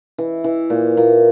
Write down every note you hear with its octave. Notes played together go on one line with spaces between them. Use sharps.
E3
E3
A#2
A#2